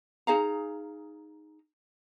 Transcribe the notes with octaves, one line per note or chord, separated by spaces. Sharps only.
D#4 G#4 F5 A#5